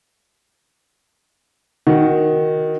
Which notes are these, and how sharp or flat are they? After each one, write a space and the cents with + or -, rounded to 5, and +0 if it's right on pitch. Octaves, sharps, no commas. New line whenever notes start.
D#3 +0 F#4 +0